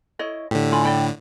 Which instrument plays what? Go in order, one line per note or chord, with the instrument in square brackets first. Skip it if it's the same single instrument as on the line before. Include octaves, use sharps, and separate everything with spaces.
[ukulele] E4 C#5 D#5
[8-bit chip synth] A2 D3 [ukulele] G4
[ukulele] F4 G#5 B5
D5 G5 B5